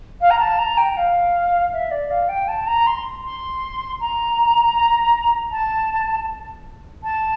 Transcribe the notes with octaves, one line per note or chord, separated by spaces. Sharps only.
F5
A#5
A5
A#5
G5
F5
E5
D5
F5
G5
A5
A#5
C6
C6
A#5
A5
A5